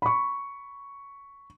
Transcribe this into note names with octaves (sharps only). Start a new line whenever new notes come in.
B5 C#6